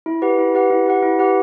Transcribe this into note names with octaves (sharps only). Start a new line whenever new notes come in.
E4
G4 B4 F#5
E4
G4 B4 F#5
E4
G4 B4 F#5
E4
G4 B4 F#5